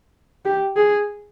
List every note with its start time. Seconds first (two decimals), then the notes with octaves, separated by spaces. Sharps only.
0.45 G4
0.76 G#4